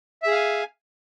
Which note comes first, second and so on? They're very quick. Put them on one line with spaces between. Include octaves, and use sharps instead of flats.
E5 G#4 F5 G#5